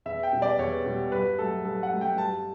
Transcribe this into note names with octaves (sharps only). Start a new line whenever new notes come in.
E2 E5
G5
B2 G3
D5
E2 C#5
B2 G3
G2 B4
F#3 A3 A4
G2 A4
F#5
F#3 A3
G5
G2 A5